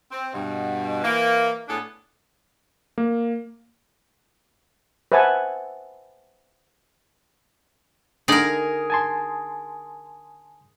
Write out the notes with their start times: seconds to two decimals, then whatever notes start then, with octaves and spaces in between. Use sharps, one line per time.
0.11 C4
0.33 G2 B2
1.03 E3 A#3
1.68 A2 B3 D4 G#4 A4
2.98 A#3
5.12 B4 C5 E5 F#5 G#5 A5
8.28 D3 D#4 G#4 A#4 D5
8.90 G#5 A5 C6